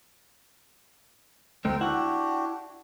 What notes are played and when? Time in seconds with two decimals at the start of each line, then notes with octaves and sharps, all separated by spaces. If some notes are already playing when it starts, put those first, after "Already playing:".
1.65 D2 G#3 A3 C4 A#4 G5
1.81 D4 E4 F#4 G4 F#5